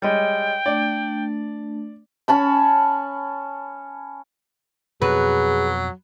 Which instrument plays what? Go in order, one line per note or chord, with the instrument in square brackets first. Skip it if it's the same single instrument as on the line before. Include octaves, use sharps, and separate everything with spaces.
[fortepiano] G3 G#3 [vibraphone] C#5 D#5 [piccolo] G5
[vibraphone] A3 D4 [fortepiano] D5
[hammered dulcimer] C#4 A5 B5
[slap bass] F2 B2 [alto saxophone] F#3 [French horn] G#4 [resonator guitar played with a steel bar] B4